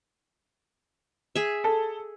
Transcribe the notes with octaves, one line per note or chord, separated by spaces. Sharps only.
G#4 E5
A4